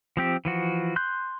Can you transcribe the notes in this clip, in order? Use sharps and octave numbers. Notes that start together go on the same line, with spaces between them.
F3 C4 G4
E3 F3 F#4
C6 F#6 G6